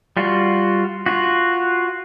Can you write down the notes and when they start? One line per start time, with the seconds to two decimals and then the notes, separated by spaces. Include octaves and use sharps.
0.17 G3 F4 F#4
1.06 F4 F#4